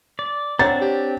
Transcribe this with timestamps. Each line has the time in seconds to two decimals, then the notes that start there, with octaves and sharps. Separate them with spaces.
0.19 D5
0.59 C4 D4 C#5 F#5 A#5 A6
0.81 G4